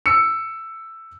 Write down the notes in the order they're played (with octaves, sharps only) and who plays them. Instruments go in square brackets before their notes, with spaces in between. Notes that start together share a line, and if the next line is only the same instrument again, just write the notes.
[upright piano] E6 C#7